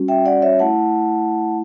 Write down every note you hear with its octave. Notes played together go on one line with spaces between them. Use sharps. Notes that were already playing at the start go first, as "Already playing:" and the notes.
Already playing: G3 C#4 F#4
E5 G5
D5 F#5
C#5 E5
A3 E4 F#5 A5